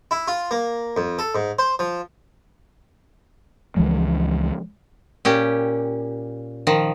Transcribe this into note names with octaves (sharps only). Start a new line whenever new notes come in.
E4
F4
A#3
F2
A4
G#2
C5
F3
C#2 E3 F3 G#3
A#2 C#4 G4
D#3 F3